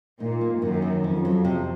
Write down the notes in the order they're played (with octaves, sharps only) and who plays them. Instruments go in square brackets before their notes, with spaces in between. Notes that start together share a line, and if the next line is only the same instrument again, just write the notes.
[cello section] A#2 [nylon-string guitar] D#4
[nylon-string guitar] A#3
[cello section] F#2 [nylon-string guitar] D#3
[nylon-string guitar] D#3
[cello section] F2 [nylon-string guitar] C#4
[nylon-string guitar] F#3
C3